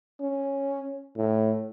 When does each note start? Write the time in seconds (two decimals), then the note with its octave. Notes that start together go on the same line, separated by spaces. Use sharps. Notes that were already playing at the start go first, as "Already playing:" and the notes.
0.20 C#4
1.17 A2